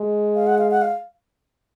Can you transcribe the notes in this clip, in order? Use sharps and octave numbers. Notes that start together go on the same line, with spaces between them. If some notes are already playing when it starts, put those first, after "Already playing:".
Already playing: G#3
F5
F#5
F5
F#5
F5